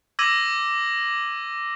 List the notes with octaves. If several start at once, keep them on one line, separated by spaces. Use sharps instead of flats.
D6 E6 G#6 A#6 D#7 F#7